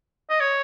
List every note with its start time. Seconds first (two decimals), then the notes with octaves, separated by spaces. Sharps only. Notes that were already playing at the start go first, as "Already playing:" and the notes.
0.30 D#5
0.40 C#5